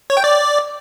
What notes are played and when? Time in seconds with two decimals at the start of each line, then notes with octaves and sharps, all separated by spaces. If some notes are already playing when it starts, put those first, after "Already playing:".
0.10 C#5
0.17 G5
0.24 D5